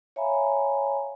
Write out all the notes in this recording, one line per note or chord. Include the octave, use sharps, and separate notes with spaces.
C#5 E5 F5 G#5 A#5 B5